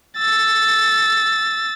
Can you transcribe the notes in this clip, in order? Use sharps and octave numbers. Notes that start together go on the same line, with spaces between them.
E6 A6